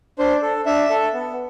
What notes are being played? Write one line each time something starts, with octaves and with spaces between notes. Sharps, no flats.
D4 C5
A4
D4 E5
A4
B3